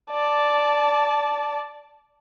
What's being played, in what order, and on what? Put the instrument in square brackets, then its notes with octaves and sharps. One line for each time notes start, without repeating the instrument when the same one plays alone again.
[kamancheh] D5 A5